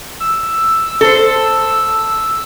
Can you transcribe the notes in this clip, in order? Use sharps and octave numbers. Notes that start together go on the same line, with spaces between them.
E6
A4 C5